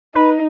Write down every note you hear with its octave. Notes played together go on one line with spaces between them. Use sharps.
D#4 B4